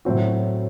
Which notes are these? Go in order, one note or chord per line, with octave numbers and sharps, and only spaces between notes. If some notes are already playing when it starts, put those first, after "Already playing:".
A2 F#3 C4 F#4